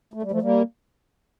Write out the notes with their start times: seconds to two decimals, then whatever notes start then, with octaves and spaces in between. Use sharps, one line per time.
0.14 A3
0.23 G3
0.31 F3 A3
0.42 G3 A#3